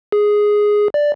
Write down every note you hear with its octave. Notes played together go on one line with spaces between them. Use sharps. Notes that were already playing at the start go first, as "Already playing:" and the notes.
G#4
D5